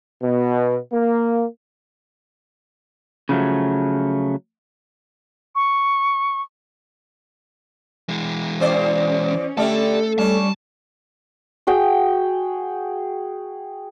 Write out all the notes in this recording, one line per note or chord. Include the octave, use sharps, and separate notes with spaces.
B2
A#3
C#3 F3 F#3 A3
C#6
E3 G#3
E2 C#4 C5 D5
D3 G3 A3 A4
G3 C#4 D4 A5
F#4 G#4 G5